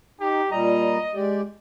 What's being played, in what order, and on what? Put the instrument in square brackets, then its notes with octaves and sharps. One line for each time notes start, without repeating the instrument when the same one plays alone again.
[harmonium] D#4 [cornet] G4
[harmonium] A#2 G3 A#5 [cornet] D#5
[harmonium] G#3 G4 D5